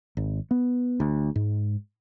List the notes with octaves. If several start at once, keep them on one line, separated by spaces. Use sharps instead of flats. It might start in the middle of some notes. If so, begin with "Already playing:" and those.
G#1
B3
D2
G#2